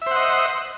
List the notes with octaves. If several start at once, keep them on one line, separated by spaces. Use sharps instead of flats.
C5 D#5 E5 F#5